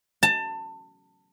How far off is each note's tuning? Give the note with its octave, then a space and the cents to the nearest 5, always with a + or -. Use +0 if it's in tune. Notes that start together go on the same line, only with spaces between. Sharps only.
A5 +25